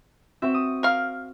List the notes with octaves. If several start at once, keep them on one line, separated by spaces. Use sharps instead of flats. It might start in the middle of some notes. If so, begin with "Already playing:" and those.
C4 F#4 E5
D#6
A#4 F5